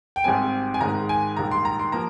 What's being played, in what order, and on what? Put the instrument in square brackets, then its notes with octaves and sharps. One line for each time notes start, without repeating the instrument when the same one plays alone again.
[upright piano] G5
G#1 G#2 G3 C4 G#5
G#5
G#1 G#2 D#3 G#3 A#5
G#5
A#1 G#2 D#3 G3 A#5
C6
A#5
C6
F3 A#3 A#5